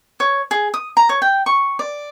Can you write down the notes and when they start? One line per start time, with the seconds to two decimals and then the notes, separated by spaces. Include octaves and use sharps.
0.20 C#5
0.51 G#4
0.74 D#6
0.97 A#5
1.09 C#5
1.22 G5
1.46 C#6
1.79 D5